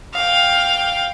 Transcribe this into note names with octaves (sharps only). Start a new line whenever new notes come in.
F5 G5